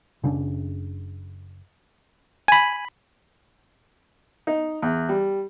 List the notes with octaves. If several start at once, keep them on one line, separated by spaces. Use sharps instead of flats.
F#1 C#3 D4
G#5 B5
D#4
E2
G3